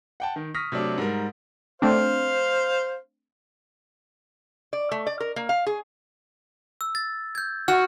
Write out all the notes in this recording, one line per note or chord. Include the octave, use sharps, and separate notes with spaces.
F#5 G5 A5
D#3
C#6 D#6 F6 A#6 B6
C3 F#3 A3 D4
G#2 G3 A#4
A3 C4 D4 C5 F5
D5
A3
D5
A#4
A#3
F5
G#4
E6
A6
G6 G#6
F#4 F6